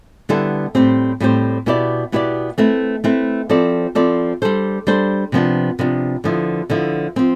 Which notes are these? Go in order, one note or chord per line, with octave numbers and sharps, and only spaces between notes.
D3 G3 B3 E4 A4
A2 G3 C4 G4 C5
A2 G3 C4 G4 C5
B2 B3 E4 G4 D5
B2 B3 E4 G4 D5
A3 C4 E4 B4
A3 C4 E4 B4
F3 C4 E4 A4 D5
F3 C4 E4 A4 D5
G3 D4 A4 C5
G3 D4 A4 C5
C3 F3 B3 D4
C3 F3 B3 D4
D3 F3 B3 E4
D3 F3 B3 E4
F3 C4